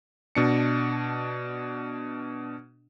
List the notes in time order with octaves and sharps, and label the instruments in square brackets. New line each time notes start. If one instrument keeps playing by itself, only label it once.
[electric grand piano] B2 D4 C#7